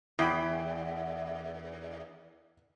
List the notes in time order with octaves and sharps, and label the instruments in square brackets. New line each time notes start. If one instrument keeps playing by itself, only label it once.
[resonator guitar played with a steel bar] E2 [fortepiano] E4 G5 B5